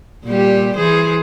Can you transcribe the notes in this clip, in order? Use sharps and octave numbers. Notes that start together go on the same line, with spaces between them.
A#2 G3 G4
E3 G#4 C5